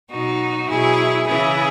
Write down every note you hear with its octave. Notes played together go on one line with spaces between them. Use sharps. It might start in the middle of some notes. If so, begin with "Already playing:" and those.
B2 F#3 D#4 F#4
B2 F#3 E4 G#4
C#3 E3 E4 G#4